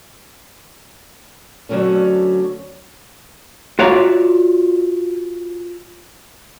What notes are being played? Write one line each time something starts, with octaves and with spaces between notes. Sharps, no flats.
D3 F#3 A3 C4 C#4
F4 F#4 C#5 D5 E5 A#5